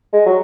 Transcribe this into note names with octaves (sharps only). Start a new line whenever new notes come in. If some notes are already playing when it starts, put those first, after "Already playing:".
G#3
F#3